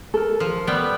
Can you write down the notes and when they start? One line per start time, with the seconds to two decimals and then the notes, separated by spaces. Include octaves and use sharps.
0.14 A4 A#4
0.40 F3
0.67 G3 B3 G5